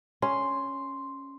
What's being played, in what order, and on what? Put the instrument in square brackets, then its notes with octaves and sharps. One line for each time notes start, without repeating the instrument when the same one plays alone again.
[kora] C#4 [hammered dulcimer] C6